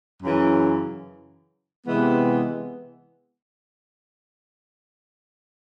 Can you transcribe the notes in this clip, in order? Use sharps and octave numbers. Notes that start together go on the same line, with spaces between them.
F#2 C#3 E3
C3 E3 G#3 B3